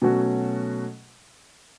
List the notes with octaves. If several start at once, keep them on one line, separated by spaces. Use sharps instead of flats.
B2 F#3 A3 C#4 F#4